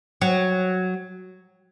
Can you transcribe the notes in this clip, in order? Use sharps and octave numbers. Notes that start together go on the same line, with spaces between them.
F#3